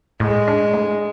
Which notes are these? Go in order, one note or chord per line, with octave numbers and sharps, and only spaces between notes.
A2 G#3
D4
A2